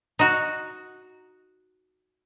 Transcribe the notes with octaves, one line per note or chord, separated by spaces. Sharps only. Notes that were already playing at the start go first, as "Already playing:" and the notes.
D#4 F#4